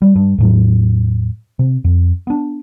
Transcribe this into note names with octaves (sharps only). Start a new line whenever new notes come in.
G3
G2
E2 A2 F#3
C3
F2
B3 D4